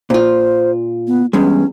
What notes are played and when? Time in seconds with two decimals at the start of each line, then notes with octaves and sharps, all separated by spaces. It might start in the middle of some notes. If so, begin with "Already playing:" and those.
0.10 A#2 F4 C5
1.07 B3
1.33 E2 G2 G#3 C#4